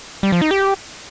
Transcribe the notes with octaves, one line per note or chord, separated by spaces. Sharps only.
G3
F3
D#4
G4